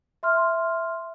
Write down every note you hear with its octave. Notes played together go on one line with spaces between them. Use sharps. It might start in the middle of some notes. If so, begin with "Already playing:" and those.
E5 C6 F6